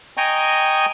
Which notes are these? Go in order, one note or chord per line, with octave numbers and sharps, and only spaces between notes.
D#5 G5 G#5 A#5 C#6 D#6